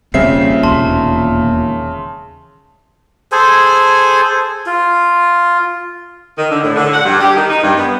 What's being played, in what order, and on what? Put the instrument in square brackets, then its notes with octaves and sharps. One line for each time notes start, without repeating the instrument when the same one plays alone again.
[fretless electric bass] E1 G3 C4 [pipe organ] A#2 [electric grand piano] C#3 E5 C7
[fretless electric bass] E1 D#2 [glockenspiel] A5 C6
[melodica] G#4 A4 C5 G#5
F4
[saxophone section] D#3
D3
A2
D3
F#5
G2
G4
D#3
D#4
G2
B3